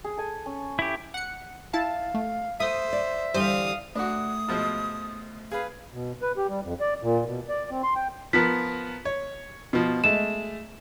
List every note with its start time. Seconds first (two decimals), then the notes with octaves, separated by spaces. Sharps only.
0.04 G#4
0.17 A4 G#5
0.46 C#4
0.79 E4 G4
1.14 F#5 C#7
1.73 E4 F5 A5
2.14 A3
2.60 A3 C5 E5 D#6
2.93 D5
3.34 D3 E3 G3 C5 F5 D#6
3.95 A3 D4 F#4 D#6
4.48 B2 F3 G#3
5.52 G#4 B4 F5
5.93 B2
6.22 B4
6.37 G4
6.49 G3
6.63 F2
6.80 D5
7.02 A#2
7.26 B2
7.49 D5
7.71 C4
7.83 C6
7.96 G5
8.33 F3 B3 A#4 B6
9.05 C#5
9.73 B2 F3
10.04 G#3 A3 E7